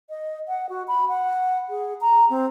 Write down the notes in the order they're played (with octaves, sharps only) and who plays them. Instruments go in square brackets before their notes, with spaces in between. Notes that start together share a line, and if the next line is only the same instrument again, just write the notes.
[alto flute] D#5
F#5
F#4
B5
F#5
G#4
A#5
C4